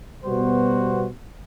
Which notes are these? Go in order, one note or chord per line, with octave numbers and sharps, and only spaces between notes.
B2 G3 B3 F#4 C5